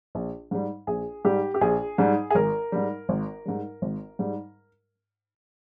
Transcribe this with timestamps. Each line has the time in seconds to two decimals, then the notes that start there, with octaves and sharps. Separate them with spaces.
0.15 A#1
0.51 G#2 G3
0.87 A#1 G#4
1.25 G#2 G3 G4
1.54 G4
1.61 A#1 G#4
1.98 G#2 G3
2.30 G#4
2.35 G#1 A#4
2.72 G#2 G3
3.09 G#1
3.45 G#2 G3
3.82 G#1
4.19 G#2 G3